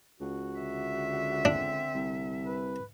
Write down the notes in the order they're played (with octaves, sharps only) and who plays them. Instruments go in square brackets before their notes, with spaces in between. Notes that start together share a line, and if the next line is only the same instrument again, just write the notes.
[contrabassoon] C#2 [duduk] F#4
[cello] D3 E5
[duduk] C4 [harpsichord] D4
[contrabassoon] C2
[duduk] B4